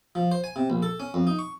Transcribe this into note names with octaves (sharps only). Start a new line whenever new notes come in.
F3
C5
G#5
C3
A#1
A4
C#4
F2
D#4
C#6